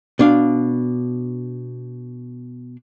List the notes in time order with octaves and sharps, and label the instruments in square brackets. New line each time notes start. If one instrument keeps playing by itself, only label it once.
[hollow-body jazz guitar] B2 D4 F5